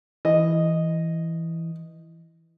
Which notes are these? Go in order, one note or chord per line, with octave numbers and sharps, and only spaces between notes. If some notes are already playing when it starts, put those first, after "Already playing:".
E3 D#5